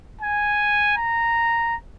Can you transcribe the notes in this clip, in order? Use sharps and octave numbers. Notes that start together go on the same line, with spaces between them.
G#5
A#5